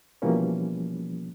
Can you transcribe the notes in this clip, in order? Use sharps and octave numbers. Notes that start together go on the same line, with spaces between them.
B2 E3 F3 G3 A#3 C#4